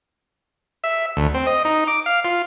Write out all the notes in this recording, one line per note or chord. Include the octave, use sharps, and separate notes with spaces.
E5
D2
C4
D#5
D#4
D6
F5
F4